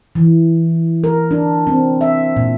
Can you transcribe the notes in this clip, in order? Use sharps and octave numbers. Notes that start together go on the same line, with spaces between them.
E3
A#4
D4
C4
E5
A#2